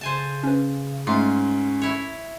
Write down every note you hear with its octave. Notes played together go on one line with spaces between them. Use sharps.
C#3 C5 G#5 A5
C#4 B4
G#2 A3 C#4 F4
E4 C#5